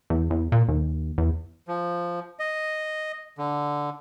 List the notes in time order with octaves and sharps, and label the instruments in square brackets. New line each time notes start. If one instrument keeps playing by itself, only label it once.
[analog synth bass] E2
E2
A#2
D#2
E2
[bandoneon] F3
D#5
D3